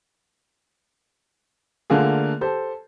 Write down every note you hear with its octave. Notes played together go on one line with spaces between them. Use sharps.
D3 A3 A#3 F4 G#4
G4 A4 C5